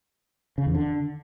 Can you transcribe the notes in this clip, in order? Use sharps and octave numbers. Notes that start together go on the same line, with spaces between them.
C#3
E2
D3